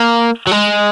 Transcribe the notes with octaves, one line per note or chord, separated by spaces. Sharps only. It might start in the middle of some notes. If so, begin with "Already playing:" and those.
Already playing: A#3
F#3
G#3